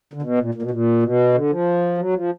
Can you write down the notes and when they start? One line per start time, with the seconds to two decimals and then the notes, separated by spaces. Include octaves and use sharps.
0.14 D3
0.22 B2
0.39 A#2
0.55 A#2
0.62 B2
0.71 A#2
1.03 B2
1.34 D3
1.50 F3
1.98 F#3
2.14 F3